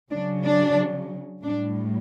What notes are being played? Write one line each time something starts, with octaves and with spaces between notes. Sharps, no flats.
C#3 F#3 D4
D4
A2 G3 D4